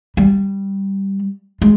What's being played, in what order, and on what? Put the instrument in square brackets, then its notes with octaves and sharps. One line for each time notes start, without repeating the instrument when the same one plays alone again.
[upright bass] G3
G#3